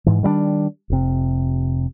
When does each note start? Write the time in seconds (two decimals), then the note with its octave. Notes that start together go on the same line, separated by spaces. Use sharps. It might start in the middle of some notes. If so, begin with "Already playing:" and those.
0.06 G#2 E3
0.23 D#3 G3 A3 D4
0.90 F1 C3